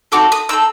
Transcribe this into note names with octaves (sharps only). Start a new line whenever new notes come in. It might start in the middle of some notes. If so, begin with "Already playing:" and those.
C4 D#4 F#4 A4 D6
D#6
C4 D#4 A4 E6